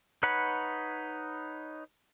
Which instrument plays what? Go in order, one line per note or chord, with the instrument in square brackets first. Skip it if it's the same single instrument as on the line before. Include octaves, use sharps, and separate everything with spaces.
[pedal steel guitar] D#4 B4 C#5 F#5 B5